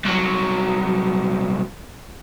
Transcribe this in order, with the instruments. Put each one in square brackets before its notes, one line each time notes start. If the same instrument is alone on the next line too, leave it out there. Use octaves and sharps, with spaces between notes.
[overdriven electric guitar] C2 F#3